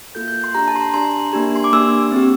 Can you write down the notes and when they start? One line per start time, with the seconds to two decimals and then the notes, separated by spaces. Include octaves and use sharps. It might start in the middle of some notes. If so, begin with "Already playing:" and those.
0.15 A#3 F4 A4 G6
0.28 G6
0.44 C6
0.55 D4 G4 A#5
0.68 A5
0.76 C6
0.81 A#5
0.94 D4 G4 C6
1.33 A#3 D4 G4
1.56 C6
1.64 D6
1.73 A#3 D4 G4 E6
2.12 C4 G4